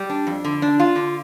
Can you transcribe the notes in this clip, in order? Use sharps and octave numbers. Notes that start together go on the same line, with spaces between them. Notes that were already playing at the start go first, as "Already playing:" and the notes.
Already playing: G3
D4
F2
D3
D4
F4
D3